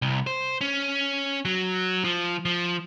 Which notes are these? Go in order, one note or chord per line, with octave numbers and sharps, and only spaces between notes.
C2
C5
C#4
F#3
F3
F3